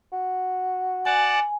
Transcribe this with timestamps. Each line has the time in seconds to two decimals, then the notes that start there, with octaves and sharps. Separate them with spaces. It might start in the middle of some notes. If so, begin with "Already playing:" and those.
0.13 F#4
1.05 D5 F#5 G#5 A5